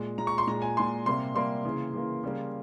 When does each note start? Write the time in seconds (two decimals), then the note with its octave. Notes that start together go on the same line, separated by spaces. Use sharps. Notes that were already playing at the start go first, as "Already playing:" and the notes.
Already playing: A#2 G#3
0.18 A#2 G#3 A#5
0.27 C#6
0.38 C6
0.47 A#2 G#3 A#5
0.62 G#5
0.77 A#2 G#3 C6
1.06 C3 G3 A#3 C6
1.34 C3 G3 A#3 C6
1.65 C#3 E3 A#3
1.93 C#3 E3 A#3
2.23 C#3 G3 A#3